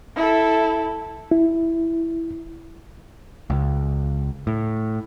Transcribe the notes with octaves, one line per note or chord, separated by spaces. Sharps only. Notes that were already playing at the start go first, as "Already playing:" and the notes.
E4 A4
E4
C#2
A2